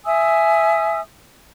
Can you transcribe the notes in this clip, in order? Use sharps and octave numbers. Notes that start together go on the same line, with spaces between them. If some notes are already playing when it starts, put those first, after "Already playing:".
E5 G#5 D#6 E6